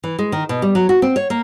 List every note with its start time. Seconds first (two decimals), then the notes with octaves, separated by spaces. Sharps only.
0.04 E3
0.19 G#3
0.32 D#3
0.49 B2
0.62 G3
0.75 F#3
0.89 F#4
1.02 C4
1.16 C#5
1.30 A#3